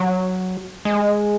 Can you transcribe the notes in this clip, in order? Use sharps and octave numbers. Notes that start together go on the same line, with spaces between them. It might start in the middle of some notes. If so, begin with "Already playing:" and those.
Already playing: F#3
G#3